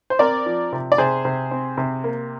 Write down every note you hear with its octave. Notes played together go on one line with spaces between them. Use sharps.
C5
C4 A#4 D5
F3
C3
D5
C3 G#4 C5
C3
C4
C3
A#3